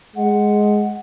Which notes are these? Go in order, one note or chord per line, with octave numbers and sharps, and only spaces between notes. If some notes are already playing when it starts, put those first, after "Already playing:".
G#3 F#5